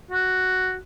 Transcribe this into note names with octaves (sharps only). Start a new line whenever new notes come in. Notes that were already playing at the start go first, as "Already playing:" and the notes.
F#4